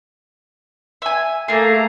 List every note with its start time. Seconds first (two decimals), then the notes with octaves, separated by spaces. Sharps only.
1.02 E5 G#5
1.48 A3 A#3 G#4 A#5